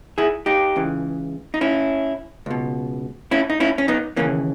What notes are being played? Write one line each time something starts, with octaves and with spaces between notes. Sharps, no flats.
E4 G#4
D#4 G4
C#2 C#3 E3
D#4
C#4 E4
C#2 B2
C#4 E4
D#4
C#4 E4
C#4
B3 D#4
D#2 C#3 E3 A#3 C#4